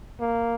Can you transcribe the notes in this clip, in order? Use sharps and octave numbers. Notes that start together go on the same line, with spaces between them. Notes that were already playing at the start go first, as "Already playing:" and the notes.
A#3